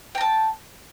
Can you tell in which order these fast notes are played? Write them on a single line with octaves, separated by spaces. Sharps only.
G5 A#5 A5